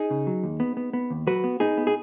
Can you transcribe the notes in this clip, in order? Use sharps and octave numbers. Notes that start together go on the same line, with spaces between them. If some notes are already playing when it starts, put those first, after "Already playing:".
Already playing: D#4 G#4
C#3
F#3
D#2
B3
B3
B3
D#2
F#3 F#4 B4
B3
B3 D#4 G#4
B3
G#4